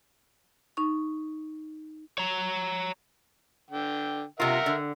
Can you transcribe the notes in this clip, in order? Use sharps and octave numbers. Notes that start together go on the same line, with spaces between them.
D#4 C#6
C#5 A#5
D3 G5
C3 F4 A#4 E5 F#5
D3